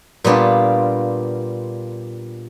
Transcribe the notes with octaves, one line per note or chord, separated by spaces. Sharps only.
A#2 G3 B3 D4 F4